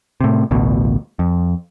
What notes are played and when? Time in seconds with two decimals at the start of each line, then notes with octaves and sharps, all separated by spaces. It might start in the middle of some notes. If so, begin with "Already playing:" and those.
0.21 A2 C3
0.51 A1 D2 B2
1.19 F2